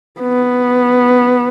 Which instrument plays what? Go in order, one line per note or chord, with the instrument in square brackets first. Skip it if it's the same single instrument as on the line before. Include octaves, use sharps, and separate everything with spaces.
[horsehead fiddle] B3